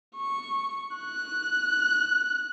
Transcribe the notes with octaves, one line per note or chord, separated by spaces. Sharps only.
C#6
F#6